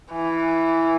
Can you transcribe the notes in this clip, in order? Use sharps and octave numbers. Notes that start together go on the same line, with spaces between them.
E3